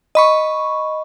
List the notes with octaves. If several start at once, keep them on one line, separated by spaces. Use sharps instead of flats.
D#5 B5 C#6